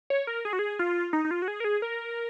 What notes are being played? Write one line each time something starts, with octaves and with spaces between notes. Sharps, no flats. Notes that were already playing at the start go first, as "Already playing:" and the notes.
C#5
A#4
G#4
F#4
G#4
F4
D#4
D#4
F4
F#4
G#4
A#4
G#4
A#4